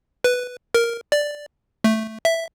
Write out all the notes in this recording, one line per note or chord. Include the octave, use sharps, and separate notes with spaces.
B4
A#4
D5
A3
E5